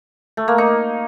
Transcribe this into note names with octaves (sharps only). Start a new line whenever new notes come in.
A3
A#3
D#4